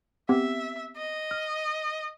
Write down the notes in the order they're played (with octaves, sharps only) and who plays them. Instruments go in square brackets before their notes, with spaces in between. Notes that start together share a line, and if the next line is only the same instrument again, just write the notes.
[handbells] B3 C4 G4 [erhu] E5
[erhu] D#5
[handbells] F6